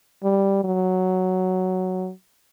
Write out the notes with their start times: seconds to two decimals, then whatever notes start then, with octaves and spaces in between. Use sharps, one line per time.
0.23 G3
0.64 F#3